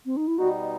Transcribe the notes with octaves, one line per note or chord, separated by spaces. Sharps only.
C4
D#4
E4
B2 G3 B3 D#4 F#4